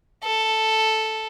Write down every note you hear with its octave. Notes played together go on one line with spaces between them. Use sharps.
A4